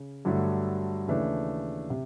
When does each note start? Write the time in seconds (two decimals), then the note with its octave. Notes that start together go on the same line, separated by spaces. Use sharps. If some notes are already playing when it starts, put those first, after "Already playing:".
Already playing: C#3
0.25 G2 D3 F#3 A3
1.07 D#2 C#3 E3 A3 D4
1.90 C3